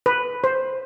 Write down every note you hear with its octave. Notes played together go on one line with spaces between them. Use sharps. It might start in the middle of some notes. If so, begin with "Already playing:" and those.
B4
C5